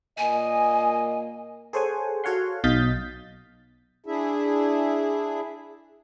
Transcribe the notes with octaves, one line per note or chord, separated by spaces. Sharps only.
A#2 A#3 D#5 G#5
G#4 A4 C5 C#5 F#5 G#5
F#4 A4 C#5 F5 F#5 C6
B1 D#5 F5 G6 A6 B6
D4 E4 G#4 E5